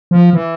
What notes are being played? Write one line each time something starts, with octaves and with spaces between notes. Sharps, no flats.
F3
E3